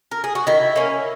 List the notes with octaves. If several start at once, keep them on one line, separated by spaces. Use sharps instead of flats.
A#4
G#4
F#4
D#3 E4
A#3 C#4